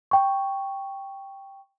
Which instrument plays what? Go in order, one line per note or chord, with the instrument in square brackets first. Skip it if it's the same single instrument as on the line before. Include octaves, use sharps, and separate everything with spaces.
[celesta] G5 C#6